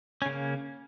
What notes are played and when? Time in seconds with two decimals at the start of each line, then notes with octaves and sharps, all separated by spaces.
0.22 C#4
0.26 C#3
0.30 A#3